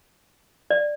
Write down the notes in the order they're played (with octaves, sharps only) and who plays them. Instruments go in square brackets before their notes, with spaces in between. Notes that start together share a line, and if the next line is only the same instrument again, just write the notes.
[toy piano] D5